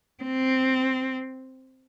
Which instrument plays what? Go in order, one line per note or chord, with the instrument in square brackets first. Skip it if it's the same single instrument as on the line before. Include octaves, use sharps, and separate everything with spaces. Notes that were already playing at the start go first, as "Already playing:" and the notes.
[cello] C4